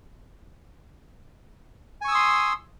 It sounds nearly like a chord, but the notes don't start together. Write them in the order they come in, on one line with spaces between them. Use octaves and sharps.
G#5 C#6 E6 D#6 C6